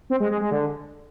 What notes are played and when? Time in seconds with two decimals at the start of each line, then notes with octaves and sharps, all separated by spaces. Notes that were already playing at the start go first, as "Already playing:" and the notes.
0.10 C4
0.20 G#3
0.31 G#3
0.41 G#3
0.51 D3